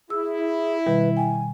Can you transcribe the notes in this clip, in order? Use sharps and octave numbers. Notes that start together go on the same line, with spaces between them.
E4 G#4 E6
B2 D#3 G3 B4
G5 G#5